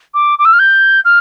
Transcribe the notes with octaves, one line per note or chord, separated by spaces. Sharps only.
D6
D6
E6
F6
G6
F6